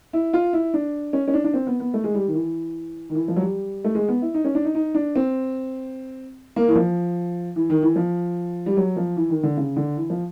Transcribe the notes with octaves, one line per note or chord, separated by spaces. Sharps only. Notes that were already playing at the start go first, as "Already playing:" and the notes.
E4
F4
E4
D4
C#4
C#4
D4
D4
C4
B3
B3
A3
G#3
G3
D#3
E3
D#3
E3
F3
F#3
G3
A3
G#3
B3
E4
D#4
C#4
D4
D#4
D#4
D4
C4
A#3
E3
F3
E3
D#3
E3
F3
G3
F#3
F3
E3
D#3
D3
C#3
D3
E3
F3